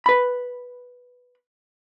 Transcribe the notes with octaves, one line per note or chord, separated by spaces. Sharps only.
B4 B5